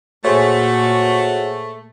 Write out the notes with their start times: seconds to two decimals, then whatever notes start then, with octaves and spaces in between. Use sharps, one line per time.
0.25 A#2 A3 F#4 G#4 C5 C#5